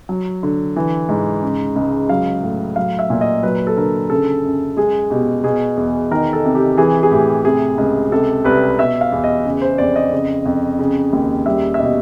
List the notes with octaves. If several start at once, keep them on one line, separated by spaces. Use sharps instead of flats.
F#3
D3
E3
G#2
C#3
C#2
F#3 F5
A2
F#3 F5
E5
A#2
D#5
F#3 B4
A4
D3 A#4
C#3 A4
F#2
G#3 G#4
B2 G4
B2 G#4
E2
D#3 A#4
A4
C3
G4
E3 G#4
G#4
A2 G4
C3 G#4
C#2
C3 A4
C2 B4
B2 E5
F5
E2
D#5
C#3
C5
F2 D5
D#5
C#3
F2
C#3
D#2
G3 E5
E5
B2 D#5